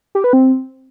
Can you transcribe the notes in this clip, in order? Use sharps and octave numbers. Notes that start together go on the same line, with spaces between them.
G4
B4
C4